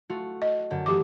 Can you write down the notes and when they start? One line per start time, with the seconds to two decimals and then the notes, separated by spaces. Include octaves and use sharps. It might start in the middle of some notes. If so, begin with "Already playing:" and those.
0.09 A3 F4 F#4
0.42 D#5
0.70 F#2 D3
0.86 E3 F#3 A3 G4 D6